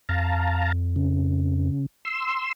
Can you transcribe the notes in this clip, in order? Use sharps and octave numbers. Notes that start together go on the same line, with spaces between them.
F2 F5 A5 A#5
C#3
C6 E6